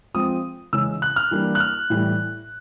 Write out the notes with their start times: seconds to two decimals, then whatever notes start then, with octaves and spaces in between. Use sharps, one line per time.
0.14 F3 G#3 C4 D#6
0.73 C#3 E3 G#3 C#4 E6
1.02 F#6
1.16 F6
1.31 E3 G3 A#3 D4
1.55 F#6
1.60 F6
1.90 A2 E3 G3